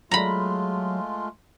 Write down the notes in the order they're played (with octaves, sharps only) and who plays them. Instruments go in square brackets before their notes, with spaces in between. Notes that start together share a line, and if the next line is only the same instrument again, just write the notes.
[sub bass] F#3 [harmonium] G#3 A3 F4 [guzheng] A#5 B5